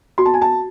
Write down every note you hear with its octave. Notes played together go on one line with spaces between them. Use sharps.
F#4 C6
A5
G#5
A5